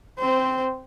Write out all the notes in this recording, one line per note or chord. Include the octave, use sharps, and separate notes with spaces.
C4 C5